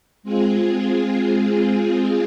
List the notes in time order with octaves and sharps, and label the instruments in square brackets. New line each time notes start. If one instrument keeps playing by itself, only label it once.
[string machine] G#3 C4 F4 G#4